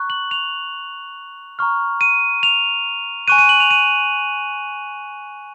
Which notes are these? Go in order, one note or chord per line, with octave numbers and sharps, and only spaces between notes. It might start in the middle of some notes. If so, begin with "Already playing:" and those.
Already playing: A#5 C#6 F#6
F#7
F7
A#5 C#6 F6
D#7
F7
G#5 C#6 F#6 D#7
D#7
F#7
F7
D#7